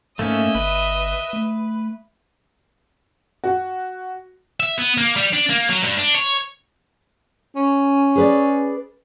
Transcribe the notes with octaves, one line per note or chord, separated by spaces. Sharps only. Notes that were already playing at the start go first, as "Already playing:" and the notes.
G#2 A3 A#3 C#4 D#5 E5
G1 B4
A3
F#4
E5
B3
A#3
G3
D4
A#3
F#3
G2
D4
C#5
C#4
G#4 B4 D5